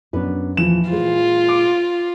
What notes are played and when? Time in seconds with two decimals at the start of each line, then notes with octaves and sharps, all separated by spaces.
0.13 F#2 B3 D4 B4
0.57 E2 A#2 E3 F3 E7
0.90 A#2 G#3 F4 C5
1.49 D6